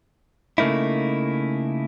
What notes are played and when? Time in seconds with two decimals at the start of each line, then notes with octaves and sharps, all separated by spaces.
0.58 C#3 A3 A#3 D#4 E4